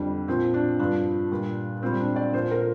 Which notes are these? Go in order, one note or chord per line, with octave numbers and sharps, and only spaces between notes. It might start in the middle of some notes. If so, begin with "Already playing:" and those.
Already playing: F2 D3 G3 D4
A#2 F3 C4
D4
G2 F3 D4
A#2 G3
A#2 G3 C4
D4
D5
A#2 F3 C5
A#4